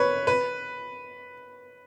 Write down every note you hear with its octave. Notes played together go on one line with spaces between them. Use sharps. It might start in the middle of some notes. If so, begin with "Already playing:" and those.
Already playing: B4 C#5
B4